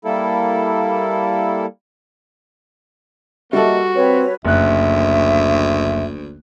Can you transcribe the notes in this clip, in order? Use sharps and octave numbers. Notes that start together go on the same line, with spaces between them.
G3 A#3 E4 A4
G3 A#3 F#4 A4 D#5 E5
C4 B4 C#5
F#1 D2 E5 F#6